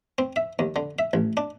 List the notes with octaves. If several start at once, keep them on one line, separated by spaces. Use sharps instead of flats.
C4
E5
D#2
D3
E5
A1
D4